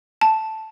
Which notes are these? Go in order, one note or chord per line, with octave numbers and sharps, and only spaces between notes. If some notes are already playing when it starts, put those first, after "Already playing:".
A5